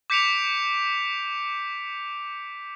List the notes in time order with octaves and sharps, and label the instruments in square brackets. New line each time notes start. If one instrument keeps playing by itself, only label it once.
[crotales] D6 G6 B6 C#7 D7 F7